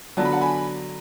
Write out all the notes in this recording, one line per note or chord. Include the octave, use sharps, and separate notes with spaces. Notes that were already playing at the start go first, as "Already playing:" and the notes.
D3 F#3 B3 D4 A5
B5
F#5 A5
G#5 B5